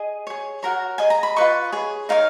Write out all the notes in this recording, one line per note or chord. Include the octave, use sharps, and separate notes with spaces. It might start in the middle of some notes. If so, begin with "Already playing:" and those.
Already playing: G#4 D#5
G#4 C#5
F#4 A#4 C#5 A#5
G#4 D#5 G#5
A#5
B5
F4 B4 D#5 C#6
G#4 C#5
D#4 A#4 C#5 F5